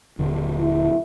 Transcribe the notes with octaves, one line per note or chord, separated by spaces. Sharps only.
D#1 D3
E4